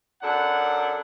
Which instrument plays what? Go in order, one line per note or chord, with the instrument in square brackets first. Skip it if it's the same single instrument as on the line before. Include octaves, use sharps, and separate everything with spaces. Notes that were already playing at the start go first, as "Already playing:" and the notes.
[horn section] F#2 D4 A4 F#5